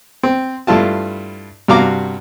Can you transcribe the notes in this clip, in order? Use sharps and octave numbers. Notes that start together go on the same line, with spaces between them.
C4
G2 A3 E4 F4 A5
G2 C3 F#4 F5 A#5 D6